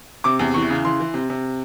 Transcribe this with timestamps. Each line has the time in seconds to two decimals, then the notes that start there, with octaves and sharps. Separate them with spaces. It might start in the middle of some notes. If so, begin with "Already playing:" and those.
0.24 C3 D6
0.39 E2
0.54 E3 C#6
0.70 C#3
0.85 E3 C6
1.00 E3
1.14 C3
1.30 C3